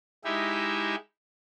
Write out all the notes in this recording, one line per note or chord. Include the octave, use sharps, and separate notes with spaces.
G#3 D#4 E4 G4 E5